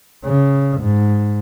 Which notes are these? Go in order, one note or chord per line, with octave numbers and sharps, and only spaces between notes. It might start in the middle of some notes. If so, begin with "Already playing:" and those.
C#3
G#2